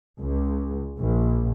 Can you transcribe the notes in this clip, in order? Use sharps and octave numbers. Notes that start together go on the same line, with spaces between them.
C#2
A#1